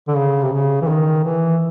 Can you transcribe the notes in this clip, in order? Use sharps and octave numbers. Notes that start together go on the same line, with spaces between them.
D3
C#3
C3
C#3
E3
D#3
E3